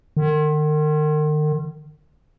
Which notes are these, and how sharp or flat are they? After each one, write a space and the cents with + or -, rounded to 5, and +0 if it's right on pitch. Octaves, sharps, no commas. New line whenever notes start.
D#3 -40